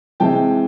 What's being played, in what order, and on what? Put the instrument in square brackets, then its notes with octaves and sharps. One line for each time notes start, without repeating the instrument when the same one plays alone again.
[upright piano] C3 E3 G#3 G5 A5